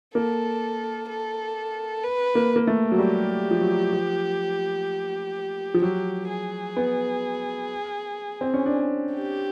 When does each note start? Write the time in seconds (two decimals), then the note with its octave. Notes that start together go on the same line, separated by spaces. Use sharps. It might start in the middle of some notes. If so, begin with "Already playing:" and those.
0.14 A#3 A4
1.09 A4
2.04 B4
2.35 A#3
2.56 A#3
2.67 A3
2.92 F#3
2.98 G3 G4
3.51 F3
3.61 F#3
3.93 F3
5.74 F3
5.82 F#3 G4
6.29 G#4
6.76 B3
8.41 C4
8.54 C#4
8.66 D4
9.14 G4